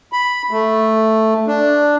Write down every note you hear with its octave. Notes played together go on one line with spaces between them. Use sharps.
B5
A3
D4